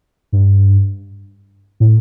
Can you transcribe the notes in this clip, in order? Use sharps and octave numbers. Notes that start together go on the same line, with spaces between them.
G2
A2